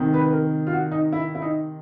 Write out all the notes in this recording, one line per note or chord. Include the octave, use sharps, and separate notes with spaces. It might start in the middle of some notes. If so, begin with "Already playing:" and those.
Already playing: C3 D#3
B4
A#4
F4
F#4
D#4
E4
E4
D#4